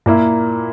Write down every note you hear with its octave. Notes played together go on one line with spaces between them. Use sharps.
A#2 A#3 E4